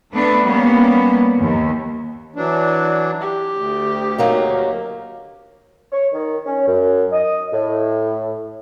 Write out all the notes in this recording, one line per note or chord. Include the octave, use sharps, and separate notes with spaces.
A3 B3 D4 B4
G3 A#3 B3 C#4
D#2
E3 F#3 D4
G4
D2
F#3 A#3 D#4
C#5
D#3
C#4
F#2
D#5
A2